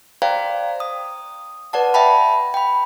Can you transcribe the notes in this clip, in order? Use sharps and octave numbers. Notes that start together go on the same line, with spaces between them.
C5 D5 F5 G5 A#5
D#6
B4 D5 F#5 A5
E5 G5 A5 B5
G5 B5